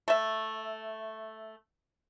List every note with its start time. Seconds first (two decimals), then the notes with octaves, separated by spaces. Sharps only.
0.08 A3 E5